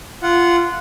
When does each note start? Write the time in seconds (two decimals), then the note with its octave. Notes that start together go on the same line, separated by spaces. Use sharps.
0.23 F4 F#5